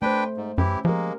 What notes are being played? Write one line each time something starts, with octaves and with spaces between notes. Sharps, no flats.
A3 D4 B4 C5 G5
G#2
F#2 E3 C#4 E4 G4
F3 G#3 A#3 G4 A#4